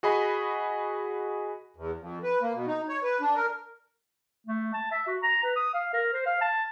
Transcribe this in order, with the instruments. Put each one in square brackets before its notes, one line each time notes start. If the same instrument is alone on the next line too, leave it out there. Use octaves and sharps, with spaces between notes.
[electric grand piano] F#4 G#4 D#5 B5
[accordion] E2
F2
B4
A#3
B2
D#4
C#5
B4
D4
A#4
[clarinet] A3
A5
E5
F#4
A#5
B4
D#6
F5
A#4
C5
F5
A5